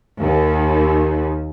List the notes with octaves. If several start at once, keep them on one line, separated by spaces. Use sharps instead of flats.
D#2